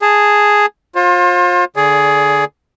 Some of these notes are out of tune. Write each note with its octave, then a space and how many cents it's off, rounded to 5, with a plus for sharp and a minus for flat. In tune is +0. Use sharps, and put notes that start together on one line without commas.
G#4 +0 A5 +0
F4 +30 C5 +40
D3 +0 G#4 +10 D5 -25